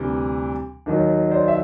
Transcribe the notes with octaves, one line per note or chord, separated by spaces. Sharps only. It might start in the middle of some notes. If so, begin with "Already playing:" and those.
Already playing: D2 C3 E3 G3
D#2 D#3 F#3
C5 D5
E5